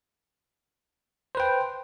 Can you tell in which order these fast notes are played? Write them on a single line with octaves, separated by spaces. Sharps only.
C5 B4 G5